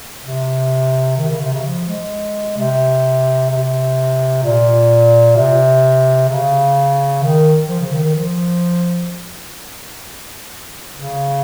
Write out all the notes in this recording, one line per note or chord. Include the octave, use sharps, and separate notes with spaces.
C3
D#3
C#3
C3
C#3
F3
G#3
C3
C3
A#2
C3
C#3
D#3
F3
C#3
D#3
D#3
F3
C#3